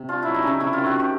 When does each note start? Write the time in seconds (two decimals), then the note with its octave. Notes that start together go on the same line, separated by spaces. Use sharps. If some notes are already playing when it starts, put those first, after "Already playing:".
Already playing: C3
0.09 D4 F4
0.22 F#3 E4
0.34 D#4
0.43 C#3 E4
0.60 C3 E4
0.73 F4
0.78 D#3
0.86 F#4
0.95 C3 G4